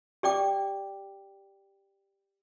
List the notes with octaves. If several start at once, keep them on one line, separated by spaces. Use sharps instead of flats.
G4 D5 G5 D6